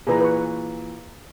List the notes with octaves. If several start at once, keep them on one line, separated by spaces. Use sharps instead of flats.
A#2 E3 G#4 B4 A#5
B4 C#6